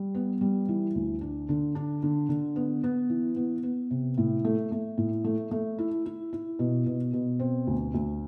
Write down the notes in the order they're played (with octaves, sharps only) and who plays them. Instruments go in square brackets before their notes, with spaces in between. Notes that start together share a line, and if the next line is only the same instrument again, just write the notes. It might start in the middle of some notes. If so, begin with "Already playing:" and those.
Already playing: [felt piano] G3
B3
G3
E3
D2
D4
D3
D4
D3
D3
B3
B3
E3
B3
B3
C3
A2
A3
A3
A2
A3
A3
E4
E4
E4
B2
B2
B2
C4
D2
D2